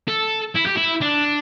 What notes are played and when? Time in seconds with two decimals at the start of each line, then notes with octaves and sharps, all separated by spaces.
0.08 A4
0.55 E4
0.66 G4
0.76 E4
1.01 D4